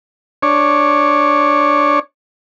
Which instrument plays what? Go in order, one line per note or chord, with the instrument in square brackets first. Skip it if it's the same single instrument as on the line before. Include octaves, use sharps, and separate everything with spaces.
[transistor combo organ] D4 C#5